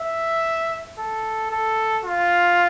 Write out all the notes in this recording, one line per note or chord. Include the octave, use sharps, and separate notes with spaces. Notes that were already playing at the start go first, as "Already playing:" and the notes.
Already playing: E5
A4
A4
F4